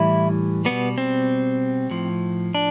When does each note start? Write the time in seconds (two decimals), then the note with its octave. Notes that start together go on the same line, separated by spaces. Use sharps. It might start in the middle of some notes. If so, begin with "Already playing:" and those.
Already playing: A2 E3 G3 E4
0.65 B2 G3 B3
0.98 C4
1.91 A2 F3
2.55 D4